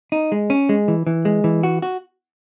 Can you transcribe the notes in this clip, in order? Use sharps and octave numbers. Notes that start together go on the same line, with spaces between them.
D#4
G#3
C#4
G#3
E3
E3
G#3
E3
F#4
F#4